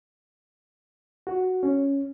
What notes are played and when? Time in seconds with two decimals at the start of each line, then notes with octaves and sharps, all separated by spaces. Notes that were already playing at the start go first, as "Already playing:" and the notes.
1.27 F#4
1.63 C#4